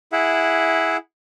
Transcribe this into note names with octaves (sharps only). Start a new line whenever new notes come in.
E4 G#4 E5 F#5